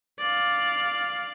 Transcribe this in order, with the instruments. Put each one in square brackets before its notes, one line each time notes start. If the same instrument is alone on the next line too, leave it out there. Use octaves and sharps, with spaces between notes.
[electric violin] D5 F5